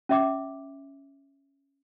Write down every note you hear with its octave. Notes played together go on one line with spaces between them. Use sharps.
C#4 E5 D6